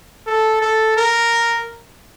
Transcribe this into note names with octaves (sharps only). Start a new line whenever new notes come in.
A4
A4
A#4